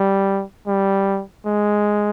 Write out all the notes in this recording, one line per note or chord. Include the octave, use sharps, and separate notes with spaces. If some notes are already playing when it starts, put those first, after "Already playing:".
Already playing: G3
G3
G#3